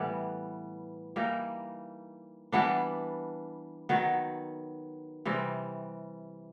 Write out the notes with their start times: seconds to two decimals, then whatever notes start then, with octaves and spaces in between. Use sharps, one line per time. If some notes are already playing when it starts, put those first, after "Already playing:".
Already playing: A2 E3 G3 B3
1.16 E3 G3 A#3 D#4
2.52 E3 G3 B3 D4
3.89 D#3 F#3 B3
5.25 C3 E3 G3 C4